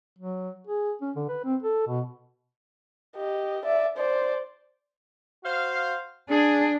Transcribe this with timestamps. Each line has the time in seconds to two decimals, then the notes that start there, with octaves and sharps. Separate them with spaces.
0.19 F#3
0.67 G#4
1.01 C#4
1.16 D3
1.29 B4
1.44 C4
1.63 A4
1.87 B2
3.16 G4 D#5
3.65 D5 E5
3.97 C5 D5
5.44 F#4 C5 F5
6.30 D4 G#4